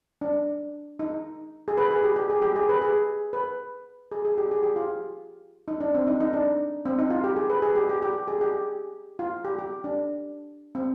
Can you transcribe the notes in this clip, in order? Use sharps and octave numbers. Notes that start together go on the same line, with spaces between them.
D4
D#4
G#4
B4
G#4
G4
G4
G#4
G4
G#4
B4
G#4
B4
G#4
G#4
G4
G#4
G4
F4
D#4
D4
C4
D#4
D#4
D4
C4
D#4
F4
G4
G#4
B4
G#4
G4
G4
G4
G#4
G4
F4
G4
G4
D4
C4